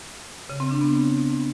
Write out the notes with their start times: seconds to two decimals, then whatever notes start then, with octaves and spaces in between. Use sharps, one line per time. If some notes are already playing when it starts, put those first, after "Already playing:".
0.49 C#3
0.60 C4
0.71 D4
0.81 B3